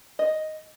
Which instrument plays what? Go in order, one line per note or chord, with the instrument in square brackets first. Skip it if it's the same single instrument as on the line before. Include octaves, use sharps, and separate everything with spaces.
[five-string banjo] D#5